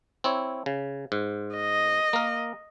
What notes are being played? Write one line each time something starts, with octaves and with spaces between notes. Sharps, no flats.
C4 E4 C#5
C#3
G#2
D#5
A#3 A#4